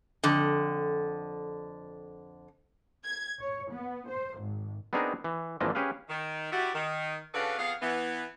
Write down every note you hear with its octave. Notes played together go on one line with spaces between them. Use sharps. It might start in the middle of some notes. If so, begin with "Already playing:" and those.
F2 D3
G#6
C#5
B3
C5
G#1
B3 C4 D4 D#4 G#4 A#4
E3
G#1 E3 F3 A#3 D4 D#5
C#4 G4 G#4 B4 F5
D#3
G3 E4 F#4
D#3
C#3 D4 F#4 A4 B4 F5
F2 B3 G#4 F5
E3 B3